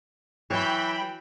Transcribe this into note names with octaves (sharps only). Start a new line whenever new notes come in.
E3 F#3 C#5 G5 B5